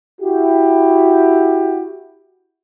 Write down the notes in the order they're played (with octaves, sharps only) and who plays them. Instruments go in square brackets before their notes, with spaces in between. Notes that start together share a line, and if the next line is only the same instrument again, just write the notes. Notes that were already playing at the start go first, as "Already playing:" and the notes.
[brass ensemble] E4 F#4 G4